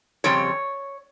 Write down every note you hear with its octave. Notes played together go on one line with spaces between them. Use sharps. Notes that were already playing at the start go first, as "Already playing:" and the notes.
F2 C#3 G3 C4 C#5